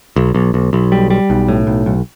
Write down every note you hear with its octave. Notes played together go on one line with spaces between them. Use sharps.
B1
B1
B1
B1
G3
G3
B1
A2
B1
B1